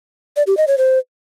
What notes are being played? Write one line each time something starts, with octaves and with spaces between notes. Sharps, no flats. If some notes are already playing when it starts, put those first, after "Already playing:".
D5
G4
D#5
C#5
C5